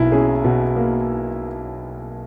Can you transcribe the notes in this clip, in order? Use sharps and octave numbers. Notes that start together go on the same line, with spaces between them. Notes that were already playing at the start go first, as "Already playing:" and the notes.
Already playing: B1 B2 E4
C#4 G#4
B2
A#3